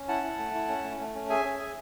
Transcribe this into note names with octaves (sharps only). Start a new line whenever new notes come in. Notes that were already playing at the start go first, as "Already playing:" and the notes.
Already playing: C#4
E4 F#5 A5
E4
A3
E4
C#4
A3
A3
C#4
G#4 E5 G#5
C#4
G#4